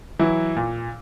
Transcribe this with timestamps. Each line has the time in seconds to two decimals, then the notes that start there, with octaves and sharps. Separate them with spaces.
0.19 E3 F#3 E4
0.56 A#2